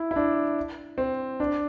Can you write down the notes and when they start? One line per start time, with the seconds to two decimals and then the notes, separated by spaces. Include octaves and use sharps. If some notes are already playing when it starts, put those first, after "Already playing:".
Already playing: E4
0.11 E4
0.16 D4
0.98 C4
1.40 D4